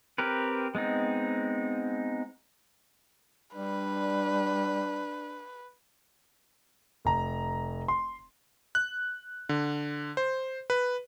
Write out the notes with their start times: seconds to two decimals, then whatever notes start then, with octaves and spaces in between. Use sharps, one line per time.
0.18 C4 G4 A#4 B4
0.75 G#3 B3 C4 D#4
3.55 G3 D4 B4
7.05 F1 A#5
7.88 C6
8.75 F#6
9.49 D3
10.17 C5
10.70 B4